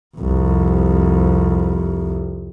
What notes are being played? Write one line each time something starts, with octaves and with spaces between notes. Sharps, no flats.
C2 F2